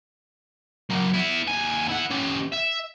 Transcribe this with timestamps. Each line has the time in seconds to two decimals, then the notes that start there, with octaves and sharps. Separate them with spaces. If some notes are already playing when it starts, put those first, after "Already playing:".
0.90 F#3 A#3
1.14 B3 E4
1.47 D#2 G#5
1.88 E4 F#5
2.11 C#4 G4
2.53 E5